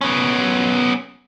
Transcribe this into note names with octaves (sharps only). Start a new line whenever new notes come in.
B3 C#4